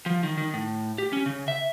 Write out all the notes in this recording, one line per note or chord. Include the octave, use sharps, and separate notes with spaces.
F3
D#3
D#3
A2
G4
C#4
C#3
E5